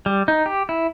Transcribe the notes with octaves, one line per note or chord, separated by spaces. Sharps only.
G3
D#4
G4
E4